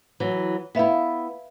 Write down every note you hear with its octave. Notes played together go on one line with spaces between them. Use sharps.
E3 F#3
B3 E4 B4 E5 F5